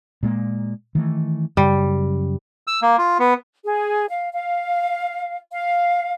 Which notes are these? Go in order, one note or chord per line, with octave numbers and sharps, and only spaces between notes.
A#2 G#3 A#3
D#3 E3 A3
F#2 C#3 G3
E6
A#3
F4
B3
G#4
F5
F5
F5